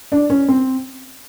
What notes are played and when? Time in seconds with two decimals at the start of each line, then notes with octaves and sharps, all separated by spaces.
0.12 D4
0.30 C#4
0.48 C4